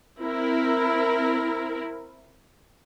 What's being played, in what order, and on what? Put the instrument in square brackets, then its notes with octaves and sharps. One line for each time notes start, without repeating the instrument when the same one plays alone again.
[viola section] C4 E4 A#4